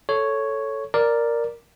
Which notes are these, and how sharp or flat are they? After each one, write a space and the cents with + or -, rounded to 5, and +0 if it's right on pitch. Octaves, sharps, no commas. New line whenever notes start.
A4 +0 C#5 +0
A#4 +0 D5 +0